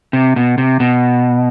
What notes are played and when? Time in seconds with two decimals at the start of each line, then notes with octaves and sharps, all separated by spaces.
0.13 C3
0.36 B2
0.58 C3
0.80 B2